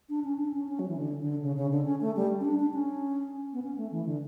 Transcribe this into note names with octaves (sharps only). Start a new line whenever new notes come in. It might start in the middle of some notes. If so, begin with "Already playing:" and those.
D4
C#4
D4
C#4
C#4
F#3
E3
D3
D3
C#3
C#3
D3
C#4
A3
G3
C#4
D4
D4
C#4
B3
C#4
A3
E3
D3